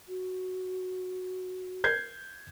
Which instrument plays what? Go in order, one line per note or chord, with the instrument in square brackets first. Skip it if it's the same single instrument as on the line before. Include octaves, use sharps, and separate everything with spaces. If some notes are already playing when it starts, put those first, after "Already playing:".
[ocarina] F#4
[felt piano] G6 G#6 C7